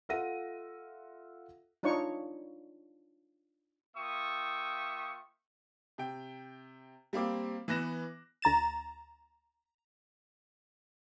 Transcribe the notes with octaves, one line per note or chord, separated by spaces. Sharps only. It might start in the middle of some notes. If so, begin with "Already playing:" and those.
F4 A4 E5 F#5 A#6 D#7
D4 D#4 F4 C#5 C#6
A#3 F4 E5 G5 C#6 D#6
C3 G5
G3 A#3 C4 D6
E3 B3 F#6 A#6 E7
D2 A#5 A6 E7